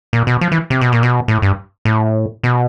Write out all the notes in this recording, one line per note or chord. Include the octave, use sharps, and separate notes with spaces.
A#2
B2
F3
E3
C3
B2
A#2
B2
A2
G2
A2
B2